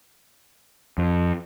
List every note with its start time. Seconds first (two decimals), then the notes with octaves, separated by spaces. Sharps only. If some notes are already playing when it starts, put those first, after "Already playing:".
0.98 F2